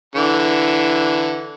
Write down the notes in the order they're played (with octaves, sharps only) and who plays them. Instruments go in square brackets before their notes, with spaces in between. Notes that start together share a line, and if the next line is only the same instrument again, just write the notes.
[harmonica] D3 E3